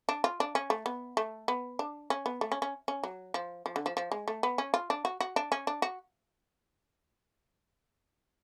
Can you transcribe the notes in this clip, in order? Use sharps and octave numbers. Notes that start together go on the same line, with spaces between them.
D4
F4
D4
C#4
A3
B3
A3
B3
D4
C#4
B3
A3
C#4
C#4
C#4
F#3
F3
F3
D3
F3
F3
G#3
A3
B3
C#4
F4
D4
F#4
F#4
D4
C#4
D4
F#4